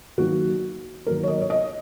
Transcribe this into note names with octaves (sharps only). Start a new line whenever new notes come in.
D#3 F#3 A#3 F#4
D#3 F#3 A#3 A#4
C#5
D#5
C#5
D#5